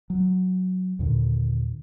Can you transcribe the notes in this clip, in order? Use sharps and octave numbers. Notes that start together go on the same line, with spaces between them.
F#3
D#2 A#2 D3